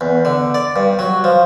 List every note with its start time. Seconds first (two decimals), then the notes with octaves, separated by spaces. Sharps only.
0.01 E2
0.25 D3
0.54 D5
0.76 G2
0.99 F#3
1.24 F3